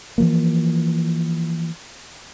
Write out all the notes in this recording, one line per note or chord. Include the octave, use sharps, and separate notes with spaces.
E3 F3 A#3